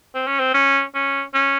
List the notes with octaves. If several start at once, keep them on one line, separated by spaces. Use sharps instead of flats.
C4
C#4
C4
C#4
C#4
C#4